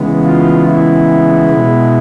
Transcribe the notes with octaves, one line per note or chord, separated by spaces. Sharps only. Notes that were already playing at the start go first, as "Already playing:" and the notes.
Already playing: C#3 E3 G#3 B3
F4
E4
B2 G#3 B3